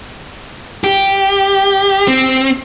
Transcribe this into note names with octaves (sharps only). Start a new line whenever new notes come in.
G4
C4